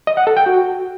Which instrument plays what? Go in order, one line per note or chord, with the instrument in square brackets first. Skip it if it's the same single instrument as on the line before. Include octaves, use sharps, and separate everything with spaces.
[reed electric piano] D#5
F#5
A4
G5
F#4